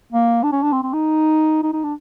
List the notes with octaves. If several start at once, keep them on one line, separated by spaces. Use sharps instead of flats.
A#3
D4
C#4
D4
C4
C4
D#4
D#4
D#4
D4